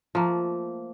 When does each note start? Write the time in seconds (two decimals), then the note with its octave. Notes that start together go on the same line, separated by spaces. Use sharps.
0.15 F3 A3 A#3